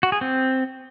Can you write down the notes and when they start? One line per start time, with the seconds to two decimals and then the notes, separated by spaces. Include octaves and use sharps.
0.03 F#4
0.12 G#4
0.21 C4